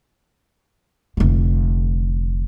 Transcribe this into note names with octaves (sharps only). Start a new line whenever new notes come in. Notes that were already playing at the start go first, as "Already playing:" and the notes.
F1 D3